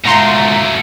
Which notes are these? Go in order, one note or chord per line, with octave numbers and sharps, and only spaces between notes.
G#2 B2 A3 F4 A#5 C6